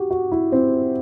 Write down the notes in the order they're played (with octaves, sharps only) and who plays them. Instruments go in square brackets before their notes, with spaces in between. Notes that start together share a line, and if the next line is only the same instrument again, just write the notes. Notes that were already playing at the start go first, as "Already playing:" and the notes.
Already playing: [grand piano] F#4 G4
F#4
E4
C4